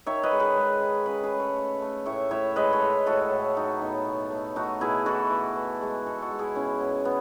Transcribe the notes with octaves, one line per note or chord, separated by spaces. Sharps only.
D#3 C#5 E5
B4 D#5
G#3
G#4 B4
G#3
D#3
C#3 G#4 B4
G#4 B4
A3
A4 C#5
A3
A3
A2 C#5 E5
A2 C#5 E5
G#3 B4 D#5
A4 C#5
G#3
A2 F#4 A4
A2
F#3 D#4 F#4
A2 B3 D#4
B2
A3
A3 D#4 F#4
B2 E4 G#4
E3 F#4 A4
E3
E3
G#3
B2 F#4 A4
F#4 A4
G#3
E4 G#4
B2 C#4 E4
B2
B3